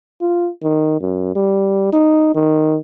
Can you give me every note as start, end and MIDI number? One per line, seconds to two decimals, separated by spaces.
0.21 0.50 65
0.63 0.98 51
1.01 1.35 42
1.35 1.88 55
1.92 2.31 63
2.35 2.77 51